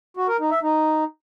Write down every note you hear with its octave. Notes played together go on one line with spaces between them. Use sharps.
F#4
A#4
D#4
E5
D#4